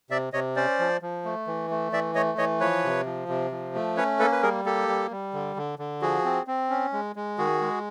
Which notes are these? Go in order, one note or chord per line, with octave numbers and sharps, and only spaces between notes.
C3 D5 E5
C3 C#5 D#5
C#4 C5 D5
F3
F3
A3
E3
A3
E3 D5 E5
A3 C#5 D#5
E3 C#5 D#5
F3 B4 C#5
C3
F3
C3
F3
A3
C#4 B4 C#5
A#3 A4 B4
B4
G3 G#4 A#4
A#3 G4 A4
G3
G3
D3
D3
D3
F3 F#4 G#4
C4
C4
C#4
G#3
G#3
D#3 F#4 G#4
G#3